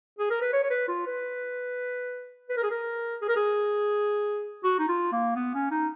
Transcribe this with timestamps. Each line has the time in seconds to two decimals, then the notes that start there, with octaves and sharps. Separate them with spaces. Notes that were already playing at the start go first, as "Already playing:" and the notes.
0.19 G#4
0.30 A#4
0.42 B4
0.53 C#5
0.63 C#5
0.70 B4
0.88 F4
1.07 B4
2.49 B4
2.57 A#4
2.63 G#4
2.71 A#4
3.21 G#4
3.28 A#4
3.36 G#4
4.64 F#4
4.79 D#4
4.88 F4
5.12 A#3
5.35 B3
5.54 C#4
5.71 D#4